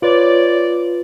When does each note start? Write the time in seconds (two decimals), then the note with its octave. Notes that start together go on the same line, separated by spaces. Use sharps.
0.02 F4 B4 C#5 D5